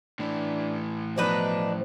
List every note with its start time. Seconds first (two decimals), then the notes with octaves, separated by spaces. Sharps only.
0.19 A2 E3 D4
1.18 B2 F3 D4 D#4 B4